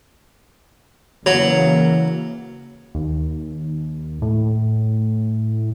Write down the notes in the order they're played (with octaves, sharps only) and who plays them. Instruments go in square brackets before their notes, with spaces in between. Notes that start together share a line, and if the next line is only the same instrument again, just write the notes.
[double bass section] C#3 E3 A#3 [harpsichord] F#3
[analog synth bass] D#2
A2